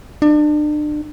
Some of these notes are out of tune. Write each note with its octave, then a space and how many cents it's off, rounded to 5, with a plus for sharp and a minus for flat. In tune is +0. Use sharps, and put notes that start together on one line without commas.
D4 +35